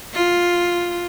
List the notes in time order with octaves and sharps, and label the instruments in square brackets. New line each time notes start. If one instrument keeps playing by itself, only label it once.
[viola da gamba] F4